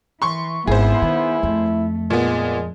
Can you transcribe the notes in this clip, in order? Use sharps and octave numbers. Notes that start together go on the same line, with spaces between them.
E3 C6 C#6
G#1 B3 E4 G#4 C5
D#3
F2 A3
A#2 F3 G#3 B3